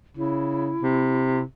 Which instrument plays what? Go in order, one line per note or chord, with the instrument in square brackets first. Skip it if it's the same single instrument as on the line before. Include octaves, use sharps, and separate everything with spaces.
[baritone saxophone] C#3 [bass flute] E4
[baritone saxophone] C3